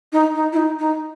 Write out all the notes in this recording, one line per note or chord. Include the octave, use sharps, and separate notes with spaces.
D#4
D#4
E4
D#4
D#4